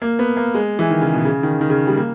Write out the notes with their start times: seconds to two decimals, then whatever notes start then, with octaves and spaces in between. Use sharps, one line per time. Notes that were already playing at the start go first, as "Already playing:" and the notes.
0.02 A#3
0.19 B3
0.37 A#3
0.54 G#3
0.79 E3
0.90 D#3
1.01 C#3
1.14 B2
1.25 C#3
1.43 D#3
1.61 D#3
1.70 C#3
1.87 G3
1.97 A#3